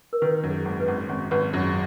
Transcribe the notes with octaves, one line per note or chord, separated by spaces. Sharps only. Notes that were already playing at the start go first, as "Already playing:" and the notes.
A#4
D#3 B4
F#2
G#4
G#1
B4
G#1
G#1 C#5
G#1 B4
F#2 G#4